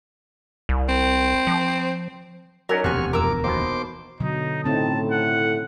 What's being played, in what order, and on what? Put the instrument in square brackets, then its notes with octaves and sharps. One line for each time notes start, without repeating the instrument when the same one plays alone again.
[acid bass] C2
[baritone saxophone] C4
[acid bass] F3
[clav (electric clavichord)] F#3 C#4 D#4 [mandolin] A#4 D5
[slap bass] E1 D2 F3 [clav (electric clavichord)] C3 [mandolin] F#4 G#5 [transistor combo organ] C#6 F6
[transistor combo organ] F2 D6 [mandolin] A#4 E6
[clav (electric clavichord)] D#2 B2 [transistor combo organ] C5 D6
[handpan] B2 D3 F#3 [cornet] D#4
[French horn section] A2 [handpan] C#3 C4 D#4 [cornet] A5
[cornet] F#5